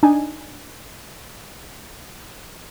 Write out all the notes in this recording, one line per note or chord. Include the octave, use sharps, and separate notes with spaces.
D4 D#4 G#5